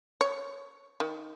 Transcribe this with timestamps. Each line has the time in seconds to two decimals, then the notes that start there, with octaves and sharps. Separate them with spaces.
0.21 C#5
1.00 D#3